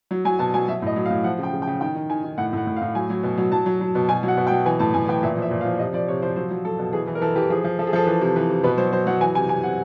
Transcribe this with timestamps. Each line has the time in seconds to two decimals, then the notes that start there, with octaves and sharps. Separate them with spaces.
0.11 F#3
0.25 F#3 G#5
0.39 B2 A5
0.54 F#3 G#5
0.68 F#3 E5
0.82 A2 D#5
0.96 F#3
1.06 F5
1.10 A2
1.24 F3 F#5
1.39 C#3 G5
1.53 C#3
1.62 G5
1.67 C#3
1.81 D#3 G5
1.95 D#3
2.10 D#3 G#5
2.24 D#3
2.38 A2 F#5
2.53 A2 F#5
2.67 A2
2.77 F5
2.82 A2
2.95 F#3 G#5
3.10 F#3
3.23 B2
3.37 F#3
3.52 F#3 A5
3.66 F#3
3.81 F#3
3.95 B2
4.09 B2 G#5
4.23 F#3
4.28 F#5
4.37 B2
4.47 G5
4.51 F#3
4.66 E3 G#5
4.79 A2 A5
4.94 A2 G#5
5.08 E3 G5
5.23 A#2 E5
5.37 F3
5.42 E5
5.51 A#2
5.61 F5
5.65 F3
5.79 C3 D#5
5.94 F3 D5
6.08 C3 C#5
6.22 F3 C5
6.36 F#3 C5
6.51 F#3
6.65 F#3 A4
6.79 B2
6.93 E3 G#4
7.07 E3
7.15 A#4
7.21 E3 A4
7.36 E3 G4
7.50 F3 G#4
7.64 F3
7.79 F3 A4
7.87 G#4
7.93 F3 A4
8.07 E3
8.21 C3
8.36 E3
8.49 C3
8.64 B2 B4
8.78 F#3 C5
8.92 F#3 C5
9.07 F#3 F#5
9.21 E3 G#5
9.35 C3 G#5
9.49 C3 G#5
9.63 C3 F#5